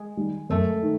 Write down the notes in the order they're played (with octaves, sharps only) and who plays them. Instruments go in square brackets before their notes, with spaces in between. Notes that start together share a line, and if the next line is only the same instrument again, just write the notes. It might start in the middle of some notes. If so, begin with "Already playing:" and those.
Already playing: [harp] G#3
[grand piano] D#3 G3
[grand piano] F#2 [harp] A3
[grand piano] D#3